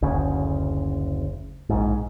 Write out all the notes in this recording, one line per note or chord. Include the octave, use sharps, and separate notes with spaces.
F#1 D2 C#3
A#1 G#2